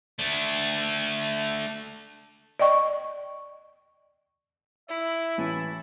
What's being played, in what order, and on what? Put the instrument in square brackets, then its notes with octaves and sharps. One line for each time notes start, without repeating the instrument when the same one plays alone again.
[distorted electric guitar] A3 D4
[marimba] D5 D#5 G5 C#6
[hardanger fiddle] E4 [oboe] E5
[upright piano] A1 [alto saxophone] E3 [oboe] A4